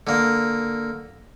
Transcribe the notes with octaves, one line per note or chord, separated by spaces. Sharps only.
D3 A#3